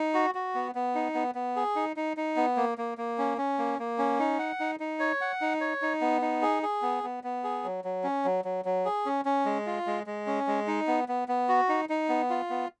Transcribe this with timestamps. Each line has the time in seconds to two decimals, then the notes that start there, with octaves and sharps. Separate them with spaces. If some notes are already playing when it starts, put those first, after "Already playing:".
Already playing: D#4
0.14 F#4
0.35 F#4
0.55 B3
0.75 B3
0.95 D#4
1.15 B3
1.35 B3
1.56 G#4
1.76 D#4
1.96 D#4
2.17 D#4
2.36 B3
2.57 A#3
2.78 A#3
2.98 A#3
3.18 C#4
3.38 C#4
3.58 A#3
3.79 A#3
3.98 C#4
4.19 D#4
4.39 F#5
4.60 D#4
4.80 D#4
5.00 C#5
5.21 F#5
5.41 D#4
5.61 C#5
5.82 D#4
6.01 B3
6.21 D#4
6.42 G#4
6.63 G#4
6.82 B3
7.03 B3
7.24 B3
7.44 G#4
7.64 F#3
7.85 F#3
8.04 C#4
8.25 F#3
8.45 F#3
8.65 F#3
8.85 G#4
9.06 C#4
9.25 C#4
9.45 G#3
9.67 F4
9.87 G#3
10.07 G#3
10.27 C#4
10.47 G#3
10.67 D#4
10.87 B3
11.08 B3
11.28 B3
11.49 F#4
11.69 D#4
11.89 D#4
12.09 B3
12.30 F4
12.50 B3